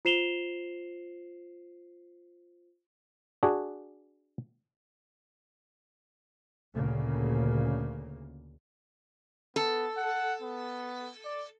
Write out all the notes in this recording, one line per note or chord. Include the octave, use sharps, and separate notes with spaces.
F4 C5 C7 E7 F7 G7
D4 F#4 G#4
D2 A#2 C#3 A#3
B3 A4
F#5
B3
D5